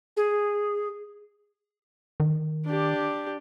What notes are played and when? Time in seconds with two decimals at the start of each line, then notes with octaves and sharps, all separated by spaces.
0.17 G#4
2.20 D#3
2.66 D4 G4